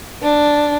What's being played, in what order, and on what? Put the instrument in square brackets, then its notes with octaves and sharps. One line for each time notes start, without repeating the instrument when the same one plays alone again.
[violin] D4